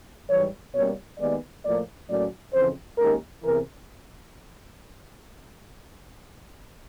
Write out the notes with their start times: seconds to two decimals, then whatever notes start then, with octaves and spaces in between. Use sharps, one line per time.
0.29 G#2 E3 G3 C#5
0.74 B2 G3 A#3 C#4 C#5
1.19 D#2 D#3 G#3 B3 D5
1.64 A2 F3 A#3 D5
2.08 A2 F#3 A#3 C#4 D5
2.53 F2 C#3 E3 C5
2.98 D#2 D#3 G#3 C#4 A#4
3.43 E2 C3 E3 A#4